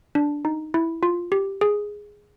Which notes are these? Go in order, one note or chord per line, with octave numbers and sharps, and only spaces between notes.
D4
D#4
E4
F4
G4
G#4